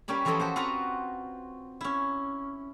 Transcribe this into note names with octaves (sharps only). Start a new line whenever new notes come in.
G3 A#3 C#4 G4 B5
E3 F3 G4 A4 D#5 B5
F#4 G4 C5
C4 F4 F#4 B4 F#5 A#5
C#4 E4